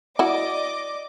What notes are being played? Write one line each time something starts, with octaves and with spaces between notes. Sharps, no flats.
E4 F#4 D5 D#5 D6